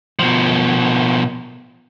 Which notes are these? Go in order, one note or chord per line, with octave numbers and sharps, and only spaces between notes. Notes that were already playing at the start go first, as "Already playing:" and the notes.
B2 F3